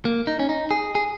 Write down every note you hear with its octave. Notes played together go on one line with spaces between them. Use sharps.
A#3
D#4
C#4
D#4
G#4
G#4